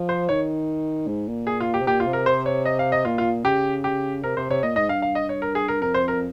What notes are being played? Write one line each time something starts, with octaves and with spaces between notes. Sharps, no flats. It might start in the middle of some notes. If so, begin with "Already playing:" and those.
Already playing: F3
C5
D#3 C#5
G#2
A#2
G#4
F4
G4
C3
A#2 G4
F4
C3
A#4
C5
C#5
D#5
F5
D#5
A#2 F4
F4
C#3 G4
G4
C3 A#4
C3 C5
C3 C#5
A#2 D#5
G#2 D#5
G2 F5
F5
D#5
C#5
A#4
G#4
A#4
F2 A#4
C5
A#4